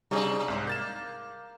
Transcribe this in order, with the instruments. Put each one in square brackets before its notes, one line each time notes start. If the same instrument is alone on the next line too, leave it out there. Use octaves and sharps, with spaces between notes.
[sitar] C3 C4 D4 [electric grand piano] G3 D#4 G#4
[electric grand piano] C2 G#2
[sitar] A#3 [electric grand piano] G6 A6 E7